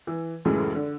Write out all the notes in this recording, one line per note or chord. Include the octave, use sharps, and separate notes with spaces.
E3
C#2 F#2 A2 E3 G#3
D3